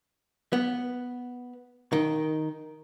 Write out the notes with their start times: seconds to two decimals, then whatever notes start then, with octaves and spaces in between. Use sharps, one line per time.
0.53 B3
1.93 D#3